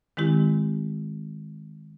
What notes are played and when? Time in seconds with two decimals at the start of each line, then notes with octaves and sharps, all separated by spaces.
0.17 D#3 G#3 C4 E4 G4